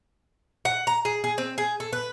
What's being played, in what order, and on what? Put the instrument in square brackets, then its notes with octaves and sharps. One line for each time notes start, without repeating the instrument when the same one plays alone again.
[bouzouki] F#5
A#5
G#4
G#4
C4
G#4
A4
B4